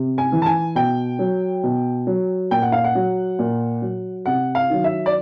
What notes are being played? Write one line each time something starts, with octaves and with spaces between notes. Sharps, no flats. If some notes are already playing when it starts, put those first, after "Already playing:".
Already playing: C3
G#5
E3
A5
G#5
B2 G5
F#3
B2
F#3
A#2 G5
F#5
F5
F#5
F#3
A#2
F#3
C3 F#5
F5
D#3 F#3
E5
D5